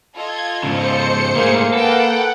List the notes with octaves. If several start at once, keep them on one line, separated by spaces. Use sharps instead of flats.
F4 A4 D#5 G#6
G#2 C#3 C5 C#7
G#2 A3 A#3 G#4
B3 A4 F#5 G5 A5